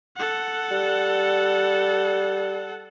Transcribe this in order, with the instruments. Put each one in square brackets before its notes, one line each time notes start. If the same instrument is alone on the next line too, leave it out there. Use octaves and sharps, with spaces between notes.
[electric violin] A4 F#5
[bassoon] G3